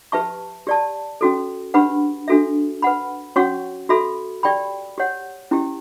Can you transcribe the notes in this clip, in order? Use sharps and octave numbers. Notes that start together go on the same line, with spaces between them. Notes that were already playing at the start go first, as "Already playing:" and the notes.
G4 B4 E5 A5 C#6
G4 D5 A5
C#4 F#4 A4
D4 G4 B4 F#5 B5
D4 F#4 A4 E5
B4 F#5 B5
C#4 F#4 C#5 F#5 C#6
F#4 A4 E5 B5
G4 D5 G5 B5
G4 C#5 F#5
C#4 E4 G4